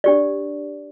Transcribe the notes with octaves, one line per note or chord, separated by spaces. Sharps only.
D4 G4 D5